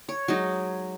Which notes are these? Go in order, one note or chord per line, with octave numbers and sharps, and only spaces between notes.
C#5
F#3 G#3 D#4